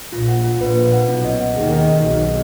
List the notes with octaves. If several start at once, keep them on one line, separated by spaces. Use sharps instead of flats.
A#1 A#2 F4
F#5
F4
A#1 A#2 B4
F4
F#5
B1 B2 C#4
D#5
F#5
D#2 D#3 G#4
C#4
D#5
B1 B2 G#4
D#5